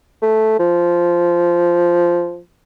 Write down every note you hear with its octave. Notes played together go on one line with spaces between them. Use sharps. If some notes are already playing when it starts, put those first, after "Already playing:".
A3
F3